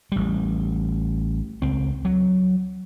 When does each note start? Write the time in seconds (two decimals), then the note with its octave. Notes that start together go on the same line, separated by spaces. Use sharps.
0.12 A1 G3
1.62 C#2 C4
2.05 F#3